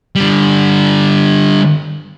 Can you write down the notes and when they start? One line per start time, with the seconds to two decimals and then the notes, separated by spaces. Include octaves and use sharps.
0.15 D3 G3